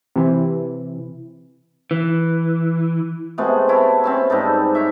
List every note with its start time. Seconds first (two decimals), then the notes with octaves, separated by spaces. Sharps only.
0.16 C3 E3
1.91 E3
3.38 C3 G#3 A3 B3
3.69 E4 C#5 A5
4.04 C4 C#4 E5
4.30 G#2 G3 D#4 A4
4.75 C#5 E5